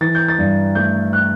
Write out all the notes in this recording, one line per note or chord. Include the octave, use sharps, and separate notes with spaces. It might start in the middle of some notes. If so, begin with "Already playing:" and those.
E3 A6
G6
A6
G2
A3 G6
F#6